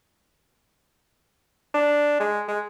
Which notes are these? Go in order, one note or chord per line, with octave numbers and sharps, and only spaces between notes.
D4
G#3
G#3